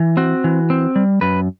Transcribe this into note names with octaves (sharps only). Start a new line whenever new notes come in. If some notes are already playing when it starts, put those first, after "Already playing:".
Already playing: E3
C4 F#4
E3
C4
G3
F#2 B4